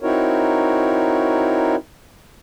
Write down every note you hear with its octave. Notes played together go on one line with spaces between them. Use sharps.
C4 D#4 E4 F#4 A#4 C#5